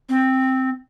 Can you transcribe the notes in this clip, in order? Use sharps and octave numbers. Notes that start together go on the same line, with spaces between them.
C4